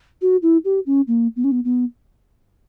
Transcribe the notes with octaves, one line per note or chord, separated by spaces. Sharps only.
F#4
E4
G4
C#4
A#3
B3
C#4
B3
B3